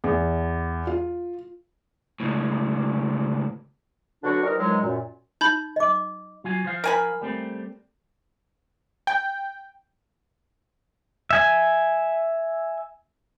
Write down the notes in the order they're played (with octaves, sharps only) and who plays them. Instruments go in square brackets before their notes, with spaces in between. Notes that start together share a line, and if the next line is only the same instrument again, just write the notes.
[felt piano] E2
F4
[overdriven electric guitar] C#2 A2
[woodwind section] B2 D3 F#3 D4 F#4
F3 G3 D#4 A#4
E2 D#3 F3 F#3 G#3
F#2 A#2
[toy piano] D#4 [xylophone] B5 G6
[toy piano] D#5 D6
[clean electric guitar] F#3 F4 G#5
F3 C5 F5
[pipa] A#4 G#5 B5
[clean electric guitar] G3 A3 C4
[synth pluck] G5
[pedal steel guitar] E5 G#5